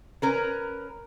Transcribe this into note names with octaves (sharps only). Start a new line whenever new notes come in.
C#4 A#4 B4